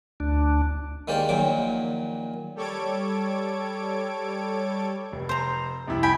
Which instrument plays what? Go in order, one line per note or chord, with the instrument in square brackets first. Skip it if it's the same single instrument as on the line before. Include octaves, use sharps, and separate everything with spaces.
[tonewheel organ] D2 D4
[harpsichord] D#3 G#3 A#3 G4 C5 D5
A#1 A#2 D#3 F#3 D6
[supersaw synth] G3 A4 C#5 D6 G#6 D7
[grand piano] F1
[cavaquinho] C5 A#5
[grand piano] C2 F2 E4
[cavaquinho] G5 G#5 B5